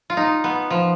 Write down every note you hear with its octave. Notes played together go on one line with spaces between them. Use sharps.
F4
D#4
B3
F3